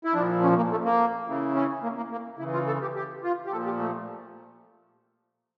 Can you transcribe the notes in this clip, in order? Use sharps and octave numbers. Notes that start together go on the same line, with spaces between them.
E4
A#2 F3 D4
C#4
A#3
A3
A#3
C#3 E3
C#4
A#3
A#3
A#3
C#3 E3 E4
F4
A4
G4
G4
F4
G4
A#2 F3 A4
G4
A3